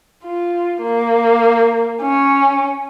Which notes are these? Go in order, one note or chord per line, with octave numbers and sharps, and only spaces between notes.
F4
A#3
C#4